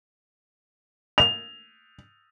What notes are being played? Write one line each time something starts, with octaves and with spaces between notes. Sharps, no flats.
F7